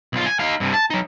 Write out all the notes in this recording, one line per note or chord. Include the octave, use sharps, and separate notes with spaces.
B1 F4
G#5
D#4 F5
G2 C3
A5
F#3 D#4